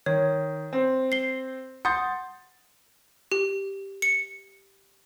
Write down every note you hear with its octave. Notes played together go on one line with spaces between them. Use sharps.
D#3 C#5
C4 C5
C7 G7
F#5 C6 D#6 G6 A6
G4
C#7